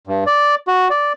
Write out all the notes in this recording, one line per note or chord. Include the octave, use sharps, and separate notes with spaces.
G2
D5
F#4
D5